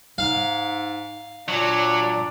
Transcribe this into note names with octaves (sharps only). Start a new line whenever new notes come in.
G#2 F5
A#2 F#3 D4